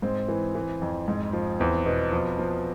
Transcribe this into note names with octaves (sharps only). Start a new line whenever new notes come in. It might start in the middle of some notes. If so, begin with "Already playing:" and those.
G#2 C4
E3
E3
F2
G#2
F3
E2 C4
B2
F3
F3